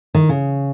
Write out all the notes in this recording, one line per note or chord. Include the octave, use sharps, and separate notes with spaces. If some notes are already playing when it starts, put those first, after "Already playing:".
D#3
C#3